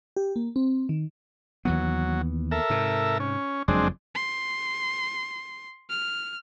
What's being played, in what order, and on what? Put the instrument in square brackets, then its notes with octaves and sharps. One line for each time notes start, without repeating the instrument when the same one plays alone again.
[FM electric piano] G4
A#3
C4
D#3
[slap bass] D#2 E3 B3 [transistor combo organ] F#3
[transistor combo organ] A4 A#4 E5
[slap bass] G#2 C3
[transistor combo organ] C#4
[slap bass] F#1 F2 F#3 [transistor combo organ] G#3 C4 D4
[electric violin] C6
F6